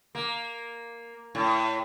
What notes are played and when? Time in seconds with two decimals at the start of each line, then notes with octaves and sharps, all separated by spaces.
0.15 A#3
1.35 A2